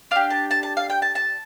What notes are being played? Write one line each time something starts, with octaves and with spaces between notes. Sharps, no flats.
D4 G4 F5
A5
A5
A5
F5
G5
A5
A5